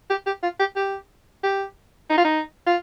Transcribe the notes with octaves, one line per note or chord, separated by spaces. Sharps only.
G4
G4
F4
G4
G4
G4
D#4
F4
D#4
F4